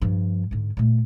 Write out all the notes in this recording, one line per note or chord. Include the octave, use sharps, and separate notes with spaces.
G2 F3
G#2 D3
A#2 A3